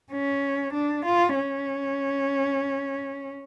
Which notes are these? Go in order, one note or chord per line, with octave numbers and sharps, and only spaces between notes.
C#4
D4
F4
C#4